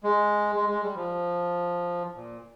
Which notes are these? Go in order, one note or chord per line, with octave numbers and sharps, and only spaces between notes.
G#3
G#3
G#3
G3
F3
A#2